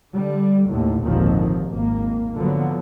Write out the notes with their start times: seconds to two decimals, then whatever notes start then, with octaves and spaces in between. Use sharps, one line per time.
0.14 D3 G3
0.70 D#2 A2 D3
1.03 G#1 D#2 A#2 D3 D#3 F3
1.69 G#1 A#3
2.36 D3 F3 F#3 B3